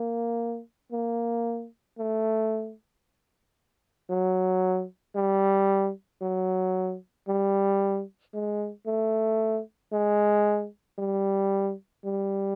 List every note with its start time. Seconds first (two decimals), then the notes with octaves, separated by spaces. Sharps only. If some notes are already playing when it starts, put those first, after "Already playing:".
Already playing: A#3
0.92 A#3
1.98 A3
4.10 F#3
5.16 G3
6.22 F#3
7.28 G3
8.34 G#3
8.86 A3
9.93 G#3
10.99 G3
12.05 G3